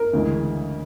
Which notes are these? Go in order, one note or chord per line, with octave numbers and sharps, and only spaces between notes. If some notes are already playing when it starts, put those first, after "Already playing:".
Already playing: A#4
D2 C#3 E3 G#3